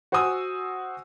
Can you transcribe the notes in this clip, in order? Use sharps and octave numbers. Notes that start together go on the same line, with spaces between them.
F#4 C5 F#5 G#5 D#6 E6